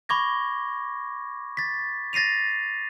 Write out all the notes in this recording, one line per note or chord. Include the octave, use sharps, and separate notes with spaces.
B5 C#6 D6 G#6 A#6
A6 B6
A6 A#6 C7 D#7 F7